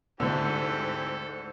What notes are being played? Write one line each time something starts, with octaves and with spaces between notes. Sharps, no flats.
D2 G#2 D3 E3 C4 G4 A4